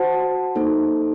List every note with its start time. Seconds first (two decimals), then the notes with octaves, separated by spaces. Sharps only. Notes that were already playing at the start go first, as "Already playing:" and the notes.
Already playing: F#4 C5 F#5 A5
0.55 A#3 D#4 A4 C5